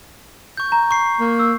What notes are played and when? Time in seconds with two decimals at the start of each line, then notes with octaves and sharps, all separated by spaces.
0.57 C#6 G6
0.72 A#5
0.91 C#6 C7
1.20 A#3
1.39 E6